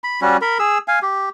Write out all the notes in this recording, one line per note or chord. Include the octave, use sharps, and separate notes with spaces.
B5
G3 C#4 F#4
A#4 B5
G#4 E6
F5 G#5
G4